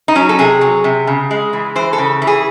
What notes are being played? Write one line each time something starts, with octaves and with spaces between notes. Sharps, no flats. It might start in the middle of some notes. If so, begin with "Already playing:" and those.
D#4
F#3 C#4
A4
C3 G#4
F#3
C3
C#3
G#3
E3
E3 C5
A4
C#3
E3
G#4